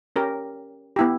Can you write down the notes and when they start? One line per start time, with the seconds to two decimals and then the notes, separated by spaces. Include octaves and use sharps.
0.16 C#4 G4 A#4
0.96 B3 E4 G4